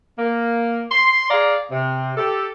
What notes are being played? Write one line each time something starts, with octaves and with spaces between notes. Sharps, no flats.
A#3
C6
G#4 D5 F5 A#5
C3
G4 A4